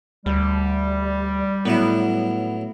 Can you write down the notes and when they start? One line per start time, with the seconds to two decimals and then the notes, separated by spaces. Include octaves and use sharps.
0.26 D2 G3
1.65 A2 F#3 B3 E4